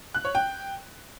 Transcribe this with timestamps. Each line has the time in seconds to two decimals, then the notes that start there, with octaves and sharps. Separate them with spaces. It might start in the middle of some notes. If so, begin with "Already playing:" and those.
0.15 F#6
0.25 C#5
0.35 G5